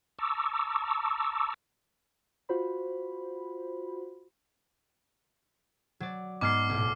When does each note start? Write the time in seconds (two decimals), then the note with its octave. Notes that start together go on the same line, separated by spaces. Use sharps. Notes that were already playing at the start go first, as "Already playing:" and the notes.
0.19 A5 A#5 C#6 D6 E6
2.49 F4 F#4 C5 B5
6.00 F#3 D5
6.41 G#2 G#3 B3 D6 F6 C7
6.69 B1 A2